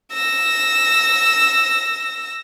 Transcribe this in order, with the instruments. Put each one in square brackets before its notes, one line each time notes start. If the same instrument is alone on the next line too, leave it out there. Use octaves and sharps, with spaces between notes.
[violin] E6 A#6